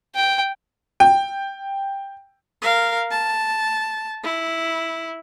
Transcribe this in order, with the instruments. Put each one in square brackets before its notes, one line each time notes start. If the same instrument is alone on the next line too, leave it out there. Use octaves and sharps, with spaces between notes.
[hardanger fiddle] G5
[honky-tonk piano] G5
[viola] A#4 F5
A5
E4